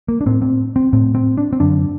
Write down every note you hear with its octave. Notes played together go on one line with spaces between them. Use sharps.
A#3
D4
A2 C4
C4
C4
A2 C4
C4
D4
C4
F#2 D3 D4